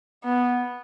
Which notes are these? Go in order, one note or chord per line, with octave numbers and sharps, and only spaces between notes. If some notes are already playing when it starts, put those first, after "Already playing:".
B3